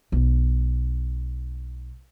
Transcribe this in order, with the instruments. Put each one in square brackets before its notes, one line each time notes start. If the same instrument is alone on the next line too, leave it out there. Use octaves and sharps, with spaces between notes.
[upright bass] B1 G#3